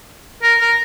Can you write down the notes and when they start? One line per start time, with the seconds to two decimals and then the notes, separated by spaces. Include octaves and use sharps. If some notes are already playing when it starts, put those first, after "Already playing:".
0.43 A#4
0.59 A#4